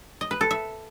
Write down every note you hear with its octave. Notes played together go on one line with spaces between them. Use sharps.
D#5
B4
A4
E5